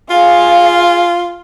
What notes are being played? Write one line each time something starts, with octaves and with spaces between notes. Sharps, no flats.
F4 G#4 F5